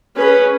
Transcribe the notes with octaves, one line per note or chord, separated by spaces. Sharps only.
C#4 G#4 B4